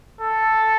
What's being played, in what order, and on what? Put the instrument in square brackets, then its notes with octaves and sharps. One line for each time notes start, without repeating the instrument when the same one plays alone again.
[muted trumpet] A4